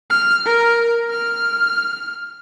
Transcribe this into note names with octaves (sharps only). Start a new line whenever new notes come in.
F6
A#4
F6